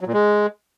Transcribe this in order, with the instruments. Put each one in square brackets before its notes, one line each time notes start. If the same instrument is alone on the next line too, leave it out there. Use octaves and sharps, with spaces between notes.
[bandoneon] F#3
A#2
G#3